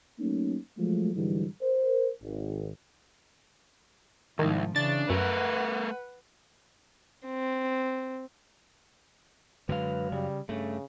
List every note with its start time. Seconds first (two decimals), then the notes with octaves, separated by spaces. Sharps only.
0.19 F#3 A3 A#3 C#4 D#4
0.76 F3 F#3 G#3 A3
1.15 G#2 D3 E3 F#3 G3
1.62 A#4 C5
2.21 G#1
4.39 C2 G#2 D#3 F3
4.76 C#3 E3 D4 A6
5.10 F#2 A3 A#4 B4 F#5
7.26 C4
9.69 F#2 D3 F#3 G#3 B4 F5
10.12 C#3 G3
10.49 G2 C#3 A3